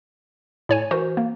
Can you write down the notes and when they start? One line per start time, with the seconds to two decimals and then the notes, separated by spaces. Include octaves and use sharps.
0.69 A2 C#5 G#5
0.91 E3 F#4 A#4 C5
1.17 A#3